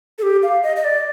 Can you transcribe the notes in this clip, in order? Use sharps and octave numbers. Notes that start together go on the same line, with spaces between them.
A4
G4
F5
D#5
D#5
D5